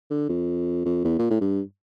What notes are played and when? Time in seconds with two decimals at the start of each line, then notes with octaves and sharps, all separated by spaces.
0.11 D3
0.29 F2
0.85 F2
1.05 E2
1.19 A#2
1.31 A2
1.41 G2